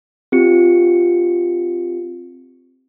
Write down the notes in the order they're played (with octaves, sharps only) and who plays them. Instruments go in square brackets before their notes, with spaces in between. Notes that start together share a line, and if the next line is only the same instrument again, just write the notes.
[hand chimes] C4 F4 G4 C#7